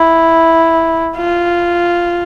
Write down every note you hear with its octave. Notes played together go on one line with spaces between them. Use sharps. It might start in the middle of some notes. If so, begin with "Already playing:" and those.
Already playing: E4
F4